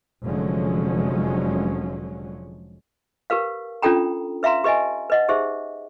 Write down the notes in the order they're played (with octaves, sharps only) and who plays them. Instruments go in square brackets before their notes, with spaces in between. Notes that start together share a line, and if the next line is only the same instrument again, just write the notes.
[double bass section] F1 D3 F3 F#3 G#3 C#4
[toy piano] G4 A#4 B4 F5
C#4 D4 F4 A4 G5 A#5
B4 E5 F5 A#5 C6
G4 B4 D#5 E5 G#5
B4 D#5 F#5
D#4 G4 G#4 C5 E5